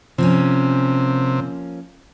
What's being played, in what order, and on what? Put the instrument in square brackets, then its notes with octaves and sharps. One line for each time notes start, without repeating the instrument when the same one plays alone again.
[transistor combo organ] C3 [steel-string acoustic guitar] F3 A#3 C#4